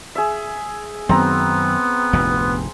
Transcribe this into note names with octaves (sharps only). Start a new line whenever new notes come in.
G#4 E5
F#2 D#3 F#3 B3 C4 A#5
F1 D2 G#2